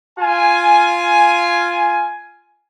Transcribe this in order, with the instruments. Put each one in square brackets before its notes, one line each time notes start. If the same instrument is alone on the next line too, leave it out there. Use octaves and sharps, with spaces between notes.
[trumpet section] F4 G#5